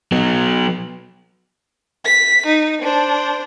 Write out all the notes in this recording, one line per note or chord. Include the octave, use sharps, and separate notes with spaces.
F#3 B3
B6
D#4
D4 C5